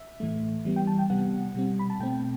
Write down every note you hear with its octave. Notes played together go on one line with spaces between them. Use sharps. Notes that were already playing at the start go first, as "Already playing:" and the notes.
Already playing: E5
A2 E3 A3
E3 G3 B3
G5
A5
G5
C3 G3 B3 F#5
B2 G3 C4
B5
A5
B2 A3 C4 G5